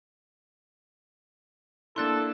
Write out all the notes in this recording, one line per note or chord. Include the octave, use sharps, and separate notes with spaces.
A#3 D4 E4 A4 C6 F#6 A6